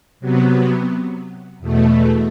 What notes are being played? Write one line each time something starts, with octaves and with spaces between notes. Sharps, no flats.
C3 F#3 B3
E2 B2 A3